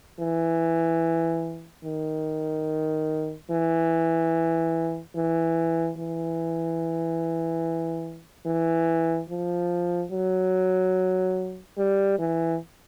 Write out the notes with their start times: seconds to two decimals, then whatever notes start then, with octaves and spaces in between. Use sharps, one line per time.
0.20 E3
1.85 D#3
3.51 E3
5.16 E3
5.98 E3
8.46 E3
9.30 F3
10.12 F#3
11.78 G3
12.19 E3